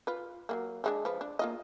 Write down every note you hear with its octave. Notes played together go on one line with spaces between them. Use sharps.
F4 B4
F#3 A3 A#3
F3 G#3 D4
F3 B4
D4
A#3 F4 D#5